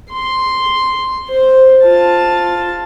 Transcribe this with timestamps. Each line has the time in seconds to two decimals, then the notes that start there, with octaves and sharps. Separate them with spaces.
0.11 C6
1.28 C5
1.84 F4 A5